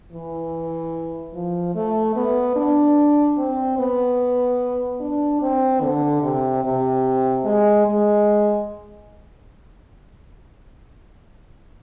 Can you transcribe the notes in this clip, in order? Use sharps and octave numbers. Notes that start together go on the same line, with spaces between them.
E3
F3
A3
B3
D4
C4
B3
D4
C4
D3
C3
C3
G#3
G#3